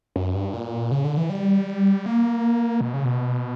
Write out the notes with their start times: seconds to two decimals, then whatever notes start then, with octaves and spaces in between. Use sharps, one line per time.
0.16 F#2
0.35 G2
0.53 A#2
0.91 C#3
1.04 D3
1.17 E3
1.30 G3
2.06 A#3
2.81 B2
2.93 C#3
3.05 B2